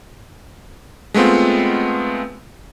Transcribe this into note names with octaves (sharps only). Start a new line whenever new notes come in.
G#3 A3 B3 C4 F4